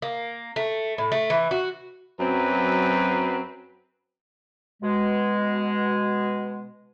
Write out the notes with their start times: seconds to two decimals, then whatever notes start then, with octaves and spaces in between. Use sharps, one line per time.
0.02 A#3
0.56 A3
0.98 A2
1.12 A3
1.30 E3
1.51 F#4
2.19 F#2 F#3 C4 B4
4.83 B2 G#3